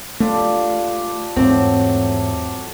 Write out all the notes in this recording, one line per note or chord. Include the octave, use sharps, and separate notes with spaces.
A3 D4 F4 G4
E2 G#2 F#3 A3 C4